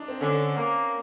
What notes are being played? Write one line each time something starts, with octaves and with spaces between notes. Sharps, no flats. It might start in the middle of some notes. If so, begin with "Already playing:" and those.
Already playing: D4 D#4
C4
D3 C#4
A#3